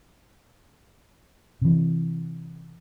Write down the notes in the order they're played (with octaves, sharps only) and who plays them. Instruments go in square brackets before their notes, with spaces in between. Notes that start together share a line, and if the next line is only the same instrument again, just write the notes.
[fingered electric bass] C3 E3